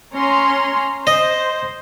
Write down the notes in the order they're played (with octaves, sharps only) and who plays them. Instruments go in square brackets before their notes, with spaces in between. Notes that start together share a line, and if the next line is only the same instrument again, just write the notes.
[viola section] C#4 A#5 C6
[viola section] C5 [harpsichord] D#5